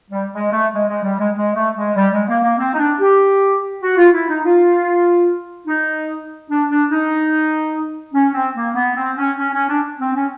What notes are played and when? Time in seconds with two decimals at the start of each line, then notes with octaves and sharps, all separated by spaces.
0.10 G3
0.32 G#3
0.52 A3
0.73 G#3
0.87 G#3
1.03 G3
1.19 G#3
1.35 G#3
1.55 A3
1.76 G#3
1.96 G3
2.12 G#3
2.27 A#3
2.42 A#3
2.58 C4
2.73 D#4
2.78 D4
2.99 G4
3.82 F#4
3.96 F4
4.13 E4
4.28 D#4
4.44 F4
5.67 D#4
6.48 D4
6.69 D4
6.90 D#4
8.13 C#4
8.34 C4
8.55 A#3
8.75 B3
8.96 C4
9.17 C#4
9.38 C#4
9.53 C#4
9.68 D4
9.99 C4
10.14 C#4